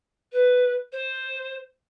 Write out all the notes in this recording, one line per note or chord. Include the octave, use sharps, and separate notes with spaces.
B4
C5